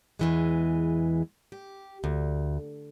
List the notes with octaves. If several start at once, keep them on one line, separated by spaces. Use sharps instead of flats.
E2 E3 G#3
G4
D2